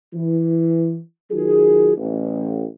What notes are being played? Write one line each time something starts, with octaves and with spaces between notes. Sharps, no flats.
E3
D#3 F#3 F4 G#4
A1